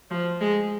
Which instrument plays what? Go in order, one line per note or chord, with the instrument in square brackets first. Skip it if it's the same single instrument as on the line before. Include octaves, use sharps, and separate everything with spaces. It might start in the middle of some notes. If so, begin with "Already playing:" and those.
[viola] F3
G#3